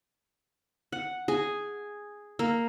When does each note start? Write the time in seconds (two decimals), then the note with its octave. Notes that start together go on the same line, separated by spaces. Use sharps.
0.92 F#5
1.28 G#4
2.39 A#3